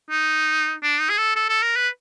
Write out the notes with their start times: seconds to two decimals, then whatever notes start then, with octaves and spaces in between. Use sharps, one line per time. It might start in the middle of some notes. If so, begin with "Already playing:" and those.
0.11 D#4
0.83 D4
1.00 D#4
1.10 G#4
1.18 A4
1.36 A4
1.49 A4
1.63 A#4
1.77 B4